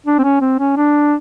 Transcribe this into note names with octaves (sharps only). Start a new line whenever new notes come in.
D4
C4
C#4
C4
C#4
D4